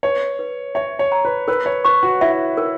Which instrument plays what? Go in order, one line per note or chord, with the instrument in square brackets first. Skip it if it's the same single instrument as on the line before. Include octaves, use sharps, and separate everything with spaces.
[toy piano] B4 [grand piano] C#5
[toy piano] B4
[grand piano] C#5 [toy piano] E5
[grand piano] C#5
[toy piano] A#5
[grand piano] B4
[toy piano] A#4 [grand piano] B4
[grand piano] C#5
[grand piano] B4 [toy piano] C#6
[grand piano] F#4
[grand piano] E4 [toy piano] E5
[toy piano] A#4